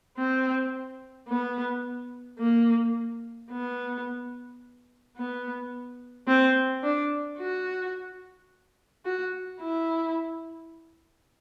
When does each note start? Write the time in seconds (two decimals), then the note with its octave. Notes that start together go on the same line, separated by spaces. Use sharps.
0.17 C4
1.28 B3
2.39 A#3
3.51 B3
5.17 B3
6.27 C4
6.83 D4
7.38 F#4
9.05 F#4
9.61 E4